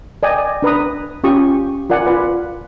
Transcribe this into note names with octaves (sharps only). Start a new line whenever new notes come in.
D5 D#5 G5 G#5 D#6
D4 B4 A#5 D#6
C#4 F4 G4 C#6 D#6
F4 A#4 D5 F#5 G#5
F4 B4